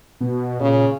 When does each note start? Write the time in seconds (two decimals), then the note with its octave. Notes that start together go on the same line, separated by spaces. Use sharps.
0.21 B2
0.60 A#2 C#3